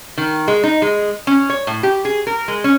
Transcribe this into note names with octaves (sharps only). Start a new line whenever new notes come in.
D#3
G#3
D#4
G#3
C#4
C#5
A2
G4
G#4
A#4
G#3
C#4